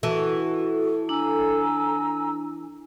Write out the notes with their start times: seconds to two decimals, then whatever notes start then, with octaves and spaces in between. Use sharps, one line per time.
0.03 E3 F#4 A4
1.09 D4 G#5 A#5 E6